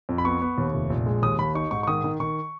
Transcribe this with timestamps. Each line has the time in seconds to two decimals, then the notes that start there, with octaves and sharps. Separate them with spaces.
0.09 F2
0.18 B5
0.25 B3 C#6
0.42 B3
0.58 D#2
0.73 F1
0.90 A#1
1.06 G#3
1.22 D#2 D#6
1.39 D#2 B5
1.55 D#4 C#6
1.71 G#2 C#6
1.83 C#6
1.87 D#3 D#6
2.04 D#3
2.20 D#3 C#6